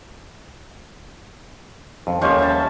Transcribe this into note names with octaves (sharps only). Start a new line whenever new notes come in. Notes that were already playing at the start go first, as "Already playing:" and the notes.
F2
D#2 F3 G3 C#4 C5 C#6
E5 A5